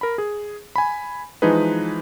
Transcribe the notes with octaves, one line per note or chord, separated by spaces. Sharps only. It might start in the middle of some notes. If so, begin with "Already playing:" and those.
A#4 B5
G#4
G#5 B5
E3 F3 G#3 D#4 G#4 B4